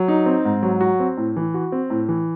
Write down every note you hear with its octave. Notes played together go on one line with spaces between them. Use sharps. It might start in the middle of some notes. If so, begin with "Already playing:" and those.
Already playing: F#3
D#4
C4
G#2
F#3
F#4
C4
A2
E3
F#4
C4
A2
E3